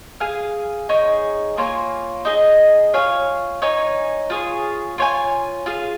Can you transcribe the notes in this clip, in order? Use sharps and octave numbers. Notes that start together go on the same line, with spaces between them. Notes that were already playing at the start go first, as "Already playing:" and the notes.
G#4 F5 G#5
D#4 G#4 C#5
A#3 F4 C#5 G#5
D#4 G#4 D#5
F4 C#5 F5 G#5
D#4 C#5 G#5
F4 G#4 C#5
F4 C#5 G#5
F4 G#4 F5